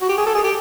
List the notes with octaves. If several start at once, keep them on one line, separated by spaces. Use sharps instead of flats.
F#4
G4
G#4
A4
G#4
G4